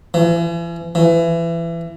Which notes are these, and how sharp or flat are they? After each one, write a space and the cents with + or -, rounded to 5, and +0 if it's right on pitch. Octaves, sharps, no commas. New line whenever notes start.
E3 +40
E3 +25